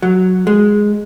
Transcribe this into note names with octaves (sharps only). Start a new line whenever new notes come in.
F#3
G#3